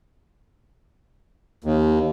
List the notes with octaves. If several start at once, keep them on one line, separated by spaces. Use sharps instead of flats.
D#2